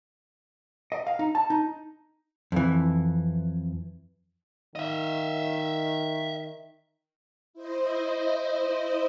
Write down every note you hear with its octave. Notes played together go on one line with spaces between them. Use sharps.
D#5
F5
D#4
A5
D#4
F2 E3
D#3 D#5 E5
E4 C5 D#5